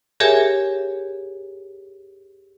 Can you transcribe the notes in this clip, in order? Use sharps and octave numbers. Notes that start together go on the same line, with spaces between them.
G4 G#4 A#4 C#5 E5 G#5